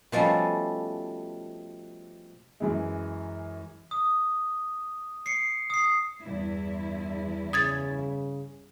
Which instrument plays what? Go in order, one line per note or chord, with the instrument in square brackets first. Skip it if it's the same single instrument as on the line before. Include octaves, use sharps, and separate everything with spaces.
[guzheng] B2 F3 G3 A3 C#4
[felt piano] F#2 E3 G#3
[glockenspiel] D#6
C7 C#7
D#6 C7
[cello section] E2 G2 E4
[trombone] C#3 [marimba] D#6 G#6 A6